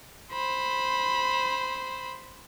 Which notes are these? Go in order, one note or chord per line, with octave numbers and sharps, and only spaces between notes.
C5 B5